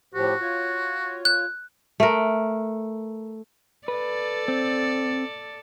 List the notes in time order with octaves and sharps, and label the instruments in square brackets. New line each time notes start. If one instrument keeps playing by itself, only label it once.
[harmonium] A2 F3 G4 [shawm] F#4
[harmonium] F4 C#5
[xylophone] F#6
[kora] A3 A#4
[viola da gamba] A4 D5 [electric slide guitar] B4
[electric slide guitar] C4